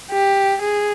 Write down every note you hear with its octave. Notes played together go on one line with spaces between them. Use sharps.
G4
G#4